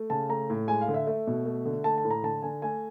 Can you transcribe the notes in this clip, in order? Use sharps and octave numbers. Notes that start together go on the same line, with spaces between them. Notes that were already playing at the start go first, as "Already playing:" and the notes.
Already playing: A3
C#3 A5
A3 A#5
A2
G#3 G#5
F5
D3
E5
A3 E5
B2
A3
D3
A3 A5
A5
A2
A#5
D3 A5
D3 G#5
A3 G#5